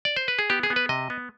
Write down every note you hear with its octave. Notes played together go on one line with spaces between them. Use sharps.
D5
C5
B4
G#4
B3 G4
G#4
B3
B4
C3 D#5
B3